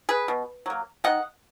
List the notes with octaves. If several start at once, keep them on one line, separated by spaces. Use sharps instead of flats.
G#4 B4
B2
F#3 A#3
D#3 D#5 F#5